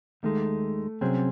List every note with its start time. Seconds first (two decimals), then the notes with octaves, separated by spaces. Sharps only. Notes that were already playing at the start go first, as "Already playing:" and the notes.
0.23 D#2 D#3 G#3 A3
1.01 C2 C3 F#3 C4 C#4 G#4